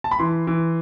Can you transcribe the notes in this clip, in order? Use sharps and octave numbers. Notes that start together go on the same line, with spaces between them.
A5
B5
E3 C6
E3